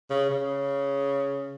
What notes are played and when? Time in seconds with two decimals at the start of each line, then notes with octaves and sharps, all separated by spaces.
0.10 C#3
0.30 C#3